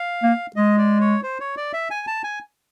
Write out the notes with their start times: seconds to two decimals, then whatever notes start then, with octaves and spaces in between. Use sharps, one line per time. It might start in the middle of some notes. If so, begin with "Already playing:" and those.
Already playing: F5
0.23 A#3
0.56 G#3 D#5
0.78 D5
1.01 C#5
1.23 C5
1.40 C#5
1.57 D5
1.73 E5
1.91 G#5
2.07 A5
2.24 G#5